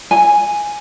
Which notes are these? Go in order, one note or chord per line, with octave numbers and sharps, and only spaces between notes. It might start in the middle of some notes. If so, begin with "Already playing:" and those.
G#5